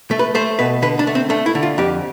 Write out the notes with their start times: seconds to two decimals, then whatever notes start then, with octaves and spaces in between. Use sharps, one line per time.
0.11 A3
0.19 B4
0.35 A3 C5
0.59 B2 B4
0.82 D3 B4
0.99 D4
1.07 A3
1.15 C4
1.30 A3 D4
1.46 E4
1.55 D3
1.63 F4
1.78 F2 G4